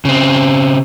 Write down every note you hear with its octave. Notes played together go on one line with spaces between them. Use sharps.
C#3 C4